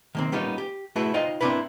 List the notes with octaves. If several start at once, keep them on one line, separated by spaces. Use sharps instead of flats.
D#3 A#3 C4
G3 A#3 B3 C#4 D#4 F4
G4
A3 E4 F#4 G#4 B4
D#4 F4 C5 D#5 G5
A#3 C4 D4 E4 B4